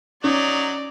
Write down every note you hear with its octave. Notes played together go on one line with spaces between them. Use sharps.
F#3 C#4 D#4 D5